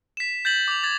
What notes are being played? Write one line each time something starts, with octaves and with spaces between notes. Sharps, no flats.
B6 E7
G6 A6 B6 F#7
D6 F7
G#6 A6